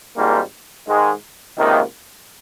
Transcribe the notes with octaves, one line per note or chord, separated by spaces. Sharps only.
G#1 G#2 G3 A#3 F4
G#2 D#3 G#3
C#2 C3 D#3 A#3